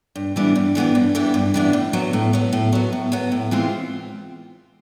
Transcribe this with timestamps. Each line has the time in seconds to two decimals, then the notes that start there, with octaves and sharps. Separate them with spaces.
0.16 G2
0.36 E3 G3 B3 D4
0.55 G2
0.75 E3 G3 B3 D4
0.95 G2
1.15 E3 G3 B3 D4
1.34 G2
1.54 E3 G3 B3 D4
1.73 A2
1.93 F#3 B3
2.13 A2
2.33 F#3 B3
2.53 A2
2.72 F#3 B3
2.93 A2
3.12 F#3 B3
3.32 A2
3.51 E3 G#3 C4 F4